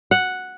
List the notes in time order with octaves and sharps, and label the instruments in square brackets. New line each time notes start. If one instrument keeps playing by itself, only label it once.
[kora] F#5